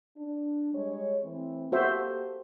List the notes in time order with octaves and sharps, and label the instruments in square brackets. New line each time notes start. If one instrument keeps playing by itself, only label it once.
[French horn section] D4
G3 G#3 C#5
E3 A3 C4
[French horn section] A#3 G4 A4 [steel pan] F#4 C5 E5